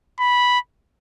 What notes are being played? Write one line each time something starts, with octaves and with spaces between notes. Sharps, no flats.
B5